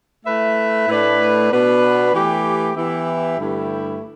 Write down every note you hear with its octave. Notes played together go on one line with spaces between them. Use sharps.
A3 E4 B4 E5
A2 A3 D4 B4
B2 B3 D4 B4
E3 A3 G4
E3 B3 E4 G4 E5
G2 D3 A3 E4 G4